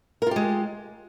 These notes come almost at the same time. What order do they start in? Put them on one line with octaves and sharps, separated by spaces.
A#4 F4 G4 G#3